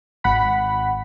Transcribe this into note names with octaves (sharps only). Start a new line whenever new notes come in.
G#1 F#5 B5